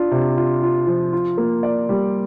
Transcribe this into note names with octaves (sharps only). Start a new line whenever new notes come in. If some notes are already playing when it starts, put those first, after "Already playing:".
Already playing: D4 F4
C3
F4
F4
F3
F4
A#3
D5
G3